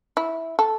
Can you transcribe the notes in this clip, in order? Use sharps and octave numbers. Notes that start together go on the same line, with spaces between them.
E4
A4